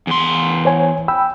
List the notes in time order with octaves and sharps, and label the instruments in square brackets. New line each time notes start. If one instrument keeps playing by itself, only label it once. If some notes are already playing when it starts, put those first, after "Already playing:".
[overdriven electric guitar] E2 C6
[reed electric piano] C5 C#5 G#5
G5 B5 E6